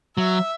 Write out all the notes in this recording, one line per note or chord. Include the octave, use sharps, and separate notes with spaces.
F#3 E5